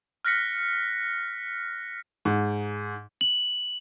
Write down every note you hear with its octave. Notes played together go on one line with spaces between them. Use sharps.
F6 F#6 A#6 B6 C#7
G#2
F#7